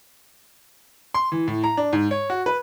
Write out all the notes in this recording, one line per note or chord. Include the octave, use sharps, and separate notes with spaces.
C6
E3
A2
A#5
D4
G#2
C#5
F#4
B4